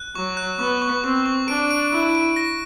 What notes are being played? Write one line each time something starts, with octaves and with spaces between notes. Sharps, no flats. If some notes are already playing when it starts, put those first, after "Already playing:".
Already playing: F#6
F#3 C#6
F#6
B3 C#6
C#6
C4 C#6
C#6
D4 D7
D7
E4 D7
D7
A#6